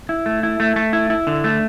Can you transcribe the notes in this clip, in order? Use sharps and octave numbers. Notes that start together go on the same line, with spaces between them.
E4
A3
E4
A3
A3
E4
E4
D3
A3